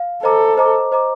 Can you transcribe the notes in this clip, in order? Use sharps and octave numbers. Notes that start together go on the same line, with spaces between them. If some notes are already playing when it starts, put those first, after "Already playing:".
Already playing: F5
A4 C5 D#5 A#5 D6
C5 D#5 A#5 D6
C5 D#5 A#5 D6